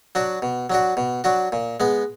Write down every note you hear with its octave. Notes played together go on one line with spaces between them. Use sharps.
F#3 D4 F#4
B2
F#3 D4 F#4
B2
F#3 D4 F#4
A#2
G#3 B3